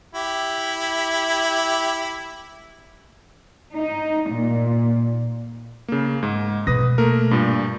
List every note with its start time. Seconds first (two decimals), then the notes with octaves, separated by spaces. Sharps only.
0.15 E4 G4
3.74 D#4
4.30 A#2
5.88 C#3 A#3
6.23 G#2
6.67 B2 B4 D#6 A#6
6.98 A3 A#3 A#4
7.31 G2 A#2